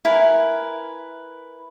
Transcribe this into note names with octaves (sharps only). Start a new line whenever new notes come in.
E4 A#4 B4 G#5